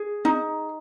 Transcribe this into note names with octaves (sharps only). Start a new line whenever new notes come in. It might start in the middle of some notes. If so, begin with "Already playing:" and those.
Already playing: G#4
D#4